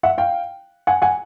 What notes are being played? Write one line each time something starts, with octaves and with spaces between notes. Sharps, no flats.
E5 F#5
F5 G5
F#5 G#5
F#5 G#5